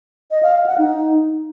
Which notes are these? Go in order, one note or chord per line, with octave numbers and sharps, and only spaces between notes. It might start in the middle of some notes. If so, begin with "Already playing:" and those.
D#5
F5
F5
F#5
D#4